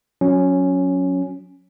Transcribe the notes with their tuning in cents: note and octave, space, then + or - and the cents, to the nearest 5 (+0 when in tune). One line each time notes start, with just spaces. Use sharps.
F#3 -25 C#4 +0